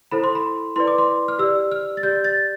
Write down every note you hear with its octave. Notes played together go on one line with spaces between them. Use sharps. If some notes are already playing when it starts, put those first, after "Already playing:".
E4 A4 C5 B5
C6
B5
E4 B4 D5 C6
D6
C6
F6
G4 D5 E6
F6
A6
G4 D5 G6
A6